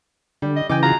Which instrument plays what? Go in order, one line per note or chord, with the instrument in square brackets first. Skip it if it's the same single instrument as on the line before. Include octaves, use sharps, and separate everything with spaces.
[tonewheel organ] D3 [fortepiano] G3
[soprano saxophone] D#5
[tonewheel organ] C#3 E3 [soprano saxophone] D#5 [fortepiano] G5 G#5 D6
[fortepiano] F4 F#4 G#4 [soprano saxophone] A#5